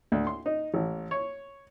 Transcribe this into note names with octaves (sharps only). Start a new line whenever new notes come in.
D2
C6
D#4
A1
C#5